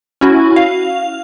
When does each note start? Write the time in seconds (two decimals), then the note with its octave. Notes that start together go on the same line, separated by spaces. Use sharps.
0.21 C#4 E4 F#4
0.56 F5